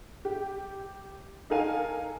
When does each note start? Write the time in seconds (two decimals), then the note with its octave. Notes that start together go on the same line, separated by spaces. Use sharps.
0.25 G4
1.50 D#4 A4 A#4 F5 G#5